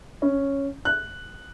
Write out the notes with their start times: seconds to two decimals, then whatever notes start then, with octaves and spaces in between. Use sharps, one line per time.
0.22 C#4
0.85 F#6